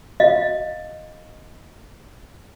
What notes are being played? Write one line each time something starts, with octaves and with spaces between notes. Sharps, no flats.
D#5 F5